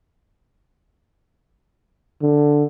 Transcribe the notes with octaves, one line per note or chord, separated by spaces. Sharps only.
D3